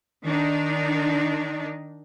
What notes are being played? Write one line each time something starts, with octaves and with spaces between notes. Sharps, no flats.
D#3 D4 D#4